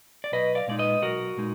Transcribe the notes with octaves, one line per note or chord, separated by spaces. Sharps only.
D5
B1 B4 D#5
D5 F5
A#2 G#3 D#4 D5
B4 D#5
B1 F#4 A#4
A#2 G#3 D#4